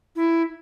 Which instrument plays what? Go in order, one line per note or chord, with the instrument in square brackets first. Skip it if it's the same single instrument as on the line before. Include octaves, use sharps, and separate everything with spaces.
[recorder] E4